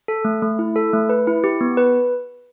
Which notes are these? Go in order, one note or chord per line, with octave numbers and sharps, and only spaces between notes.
A4
A3
A3
E4
A4
A3
B4
E4
G4
B3
B4